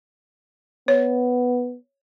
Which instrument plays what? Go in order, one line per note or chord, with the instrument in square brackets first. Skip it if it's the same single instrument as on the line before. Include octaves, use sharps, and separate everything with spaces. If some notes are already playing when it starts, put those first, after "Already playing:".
[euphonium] B3 [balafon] C#5